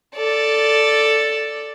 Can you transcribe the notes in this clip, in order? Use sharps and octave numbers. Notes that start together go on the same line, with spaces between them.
A4 D5